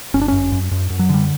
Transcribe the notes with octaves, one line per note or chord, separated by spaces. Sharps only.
G1 C#4
D4
F#2 C#4
F#2
F#2
F#2
F#3
D3 G3